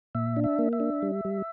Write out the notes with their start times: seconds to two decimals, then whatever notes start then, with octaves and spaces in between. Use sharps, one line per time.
0.15 A#2 E5
0.37 D4
0.44 E5
0.59 A#3
0.73 E5
0.80 D4
1.02 G3
1.25 G3